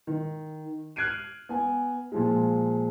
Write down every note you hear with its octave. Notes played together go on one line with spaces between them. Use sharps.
D#3
F6 F#6 G#6 C7 D7 D#7
B3 G#5
A#2 F3 G#3